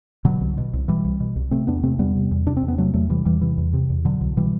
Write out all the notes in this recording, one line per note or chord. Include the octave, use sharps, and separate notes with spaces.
B2 D3 F#3
C2
B2
C2
B2 E3 G3
C2
B2
C2
C3 A3 C4
E2 B3 D4
C3 A3 C4
E2 G3 B3
C3
E2
C3 D4
C4
E2
B3
C3 F#3 A3
E2 F#3 A3
C3 E3 G3
E2 E3 G3
C3 E3
E2
C3
E2
B2 D3 F#3
C2
B2 E3 G3